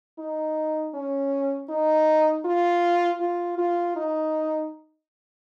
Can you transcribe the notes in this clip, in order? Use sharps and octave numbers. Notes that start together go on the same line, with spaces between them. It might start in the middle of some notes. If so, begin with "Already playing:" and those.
D#4
C#4
D#4
F4
F4
F4
D#4